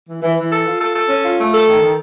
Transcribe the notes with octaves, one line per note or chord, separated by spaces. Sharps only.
E3
E3
E3
A4
F4
A4
A4
C#4
F4
A3
A4
D#3
D#3